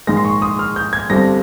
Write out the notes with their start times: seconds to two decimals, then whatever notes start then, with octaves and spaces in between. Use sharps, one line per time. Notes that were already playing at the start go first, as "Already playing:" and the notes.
0.07 A#1 G#2 D#3 G#3 A#6
0.17 C6
0.25 C#6
0.42 D#6
0.59 F6
0.76 G6
0.93 G#6
1.10 G1 G2 G3 C4 A#6